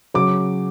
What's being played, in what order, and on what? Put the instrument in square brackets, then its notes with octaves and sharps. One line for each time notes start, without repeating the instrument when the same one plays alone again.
[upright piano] C#3 F#3 D6